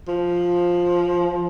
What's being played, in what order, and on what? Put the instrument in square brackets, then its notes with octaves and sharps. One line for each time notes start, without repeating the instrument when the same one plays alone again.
[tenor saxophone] F3